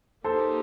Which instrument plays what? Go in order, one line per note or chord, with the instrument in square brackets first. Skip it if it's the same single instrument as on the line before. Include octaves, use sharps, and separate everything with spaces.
[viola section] A#3 D#4 G4 [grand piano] A4 C5